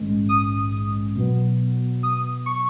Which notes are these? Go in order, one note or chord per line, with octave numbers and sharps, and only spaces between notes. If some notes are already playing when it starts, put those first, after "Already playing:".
Already playing: A#1 G#2 D#3 G#3 C#4
D#6
B2 F#3 B3
D#6
C#6